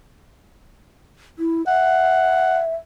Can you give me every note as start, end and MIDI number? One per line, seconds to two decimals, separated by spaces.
1.39 1.66 64
1.67 2.74 76
1.67 2.60 78